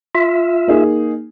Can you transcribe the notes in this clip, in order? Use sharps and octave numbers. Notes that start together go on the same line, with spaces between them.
F4 E5
A#3 D#4 G#4